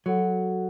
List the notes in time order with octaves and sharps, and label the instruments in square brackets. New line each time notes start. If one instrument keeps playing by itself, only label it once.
[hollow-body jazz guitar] F#3 [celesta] F#4 A4 F#5